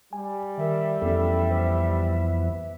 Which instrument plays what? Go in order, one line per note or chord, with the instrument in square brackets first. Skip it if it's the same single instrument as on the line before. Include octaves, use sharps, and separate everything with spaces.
[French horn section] G3 [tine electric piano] G#5
[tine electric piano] D#3 A#4 [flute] E5
[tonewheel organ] F2 E3 B3 [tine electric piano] C#4 A4
[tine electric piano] C5